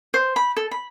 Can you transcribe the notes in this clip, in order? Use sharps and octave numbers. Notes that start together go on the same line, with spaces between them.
C5
B5
A4
B5